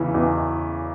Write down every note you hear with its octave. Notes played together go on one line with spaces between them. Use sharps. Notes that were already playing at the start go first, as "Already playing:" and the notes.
Already playing: E2 C#3 E3
E2